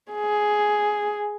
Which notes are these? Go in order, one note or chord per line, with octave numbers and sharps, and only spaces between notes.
G#4